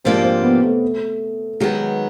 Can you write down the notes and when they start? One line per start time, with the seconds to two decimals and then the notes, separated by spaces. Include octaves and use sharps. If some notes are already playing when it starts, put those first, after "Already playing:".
0.04 G#2 F3 A#3 C4 D4 G4
0.24 C4
0.43 B3
0.63 A3
1.60 D#3 F#3 G#3 B3